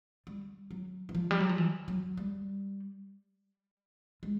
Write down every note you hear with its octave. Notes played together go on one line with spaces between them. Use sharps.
G3
F#3
E3
F3
G3
F#3
F3
E3
F#3
G3
G#3